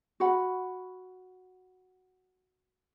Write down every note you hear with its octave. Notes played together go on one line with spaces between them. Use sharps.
F#4 F#5 B5